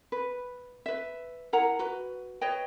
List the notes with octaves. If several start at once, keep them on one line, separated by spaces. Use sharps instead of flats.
B4
B4 E5
E4 A#4 F#5 A#5
F#4 B4
B4 C#5 D#5 G5